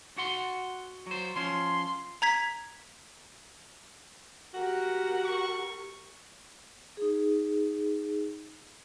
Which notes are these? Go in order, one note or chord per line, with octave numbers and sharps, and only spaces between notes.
F#4 F#5 C6
F#3 C5
F3 C#4 C6
A#5 G#6 B6
F#4 G4 A#4 F#5
C#6
D#4 G#4